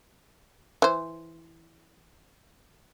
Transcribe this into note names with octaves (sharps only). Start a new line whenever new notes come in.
E3 C5